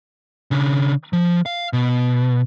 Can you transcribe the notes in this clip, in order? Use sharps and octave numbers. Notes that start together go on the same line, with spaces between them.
C#3 D4
F3
F5
B2